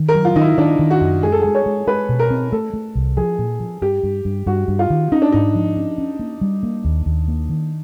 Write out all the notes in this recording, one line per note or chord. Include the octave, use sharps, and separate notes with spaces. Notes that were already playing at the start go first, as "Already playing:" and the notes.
Already playing: D#3
A#4
F#3
F4
D#3 D#4
E4
D#3 D4
D#3
F#4
F#2
G#3 G#4
A4
G#3 G#4
C#5
G#3
G#3 B4
B2
A#4
C4
A3 A4
A3
C2
F3 G#4
A#2
F3
G2 G4
G2
G2
G2 F#4
G2
F4
D#3
C#4 D#4
D4
G#2 D#4
F3
C#4
C#4
A#3
G3
A#3
D#2
D#2
A#3
D#3